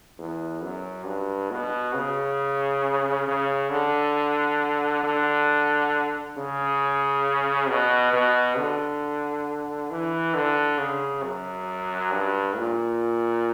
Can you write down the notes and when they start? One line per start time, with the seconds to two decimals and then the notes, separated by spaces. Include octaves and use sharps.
0.18 E2
0.62 F#2
1.06 G2
1.51 B2
1.95 C#3
3.27 C#3
3.71 D3
5.04 D3
6.37 C#3
7.69 B2
8.13 B2
8.58 D3
9.91 E3
10.34 D3
10.78 C#3
11.23 F#2
12.11 G2
12.56 A#2